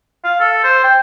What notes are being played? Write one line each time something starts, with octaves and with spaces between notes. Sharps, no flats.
F5
A4
C5
G5